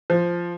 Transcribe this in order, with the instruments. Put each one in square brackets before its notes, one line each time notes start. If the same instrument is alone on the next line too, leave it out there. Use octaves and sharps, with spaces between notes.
[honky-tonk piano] F3